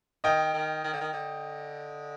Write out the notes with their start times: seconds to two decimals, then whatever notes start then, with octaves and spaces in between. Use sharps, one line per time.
0.24 D#3 D#5 G5
0.54 D#3
0.84 D#3
0.93 D3
1.01 D#3
1.13 D3